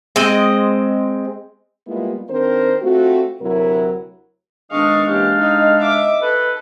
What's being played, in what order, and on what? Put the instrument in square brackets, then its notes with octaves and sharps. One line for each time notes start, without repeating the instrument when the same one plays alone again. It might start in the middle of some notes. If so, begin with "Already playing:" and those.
[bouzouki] G#3 C4 D#5
[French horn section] G3 G#3 A#3 B3 E4 F4
D#3 C4 D4 A#4 C5
A3 C4 F4 F#4
D2 C3 F#3 E4 A#4
[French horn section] D#3 B3 [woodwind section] G#3 D4 [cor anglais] D#5 [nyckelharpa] F5 C#6
[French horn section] E3 A#3 C#4 [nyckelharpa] G4 [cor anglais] F5
[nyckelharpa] D#4 [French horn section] D#5
[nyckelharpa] E5 D6
[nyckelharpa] A4 [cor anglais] B4